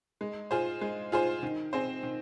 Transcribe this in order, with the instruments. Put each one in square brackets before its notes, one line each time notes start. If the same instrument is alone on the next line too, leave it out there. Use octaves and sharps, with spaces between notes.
[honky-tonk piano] G#3
F4 G#4 C5
G#3
F4 G#4 C5
D#3
C4 G#4 C5
D#3